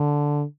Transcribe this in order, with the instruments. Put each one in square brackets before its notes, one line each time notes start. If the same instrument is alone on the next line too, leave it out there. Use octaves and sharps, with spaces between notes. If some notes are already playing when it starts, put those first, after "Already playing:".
Already playing: [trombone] D3